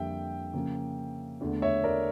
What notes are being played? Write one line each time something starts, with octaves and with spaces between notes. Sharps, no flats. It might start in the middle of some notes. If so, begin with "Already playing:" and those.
Already playing: F2 D3 G3 A#3 E5 G5
C#3 F3 A#3
E2 D3 A3
C#5 E5
A#4 D5